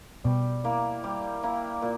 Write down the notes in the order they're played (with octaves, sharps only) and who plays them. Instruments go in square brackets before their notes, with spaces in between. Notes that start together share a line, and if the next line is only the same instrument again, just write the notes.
[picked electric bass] B2 [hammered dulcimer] G3
[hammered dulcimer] A#3 E4
G3
A#3 E4
A#2